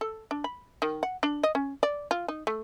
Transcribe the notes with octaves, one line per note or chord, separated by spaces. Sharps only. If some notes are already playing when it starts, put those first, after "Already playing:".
A4
D4
B5
D#3
F#5
D4
D#5
C#4
D5
F4
D#4
A3